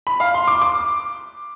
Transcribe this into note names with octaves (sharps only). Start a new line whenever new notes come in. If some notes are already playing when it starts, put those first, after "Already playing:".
B5
F5
C6
D6
D6